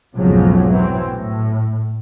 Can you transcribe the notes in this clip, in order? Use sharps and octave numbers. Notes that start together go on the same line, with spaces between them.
B1 F2 G#2 C#3 F3 F#3
E3 F#3 C4
A2